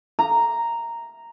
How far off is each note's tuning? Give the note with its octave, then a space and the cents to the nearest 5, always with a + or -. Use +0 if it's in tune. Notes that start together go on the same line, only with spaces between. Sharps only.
A#5 -5